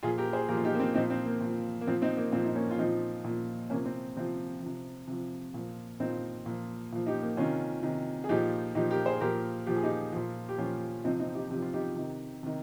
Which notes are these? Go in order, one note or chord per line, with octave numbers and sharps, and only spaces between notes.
A#2 F3 F4 G#4
G4 A#4
G#4 C5
A#2 F3 G4 A#4
F4
D#4 G4
A#3
C4
A#2 F3 C4 D#4
C4
A#3
A#2 F3
A#3
A#2 F3 C4
C4 D#4
A#3
A#2 F3 C4
D#4
A#3 C#4
F4
A#2 F3 C4 D#4
A#2 F3
C3 F3 A#3 C#4
C4
C3 F3 C4
C3 F3
C3 F3
A#2 F3
A#2 F3 C4 D#4
A#2 F3
A#2 F3
D#4 G4
A#3
C3 D#3 C#4 F4
C3 D#3
G#4
A#2 F3 D#4 G4
A#2 F3 D#4 G4
G4 A#4
G#4 C5
A#2 F3 G4 A#4
A#2 F3 G4
G#4
D#4 G4
A#2 F3
G4
A#2 F3 C#4 F4
C3 F3 C4 D#4
C4 D#4
D#4 G4
C3 F3 G4
F4
D#4 G4
C3 D#3
C3 D#3